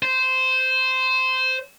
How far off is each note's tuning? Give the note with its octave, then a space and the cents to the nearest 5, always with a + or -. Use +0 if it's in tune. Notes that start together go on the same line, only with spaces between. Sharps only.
C5 -15